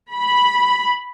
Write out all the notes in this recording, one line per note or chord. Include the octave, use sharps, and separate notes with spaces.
B5